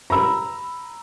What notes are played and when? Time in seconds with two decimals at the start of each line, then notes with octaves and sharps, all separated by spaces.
0.10 A#5 B5 E6